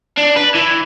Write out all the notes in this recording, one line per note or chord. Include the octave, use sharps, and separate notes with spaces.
D4
B4
E3